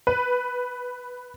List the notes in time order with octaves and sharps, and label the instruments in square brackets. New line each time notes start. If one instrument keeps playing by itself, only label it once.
[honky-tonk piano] B4